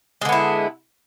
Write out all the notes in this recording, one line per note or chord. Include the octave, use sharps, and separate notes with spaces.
D3 G#3 B3 E4